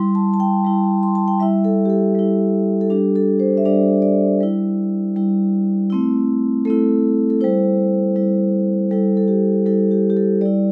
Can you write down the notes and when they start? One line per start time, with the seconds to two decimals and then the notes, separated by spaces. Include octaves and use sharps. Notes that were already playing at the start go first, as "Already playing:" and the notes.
Already playing: G3 E4 C6
0.15 A5
0.34 A5
0.40 G5
0.65 G3 E4
1.03 C6
1.15 A5
1.28 G5
1.40 G3 E4 E5
1.64 A4
1.85 G4
1.90 A4
2.15 G3 E4
2.81 A4
2.90 G3 D4 G4
3.16 A4
3.40 C5
3.57 E5
3.65 G3 D4 D5
4.02 D5
4.40 G3 E4
5.16 G3 E4
5.90 A3 C4 E4
6.65 A3 C4 E4 A4
7.30 A4
7.41 G3 E4 C5
8.16 G3 E4
8.91 G3 E4 A4
9.17 A4
9.28 G4
9.66 G3 E4 A4
9.91 G4
10.10 G4
10.17 A4
10.41 G3 E4 D5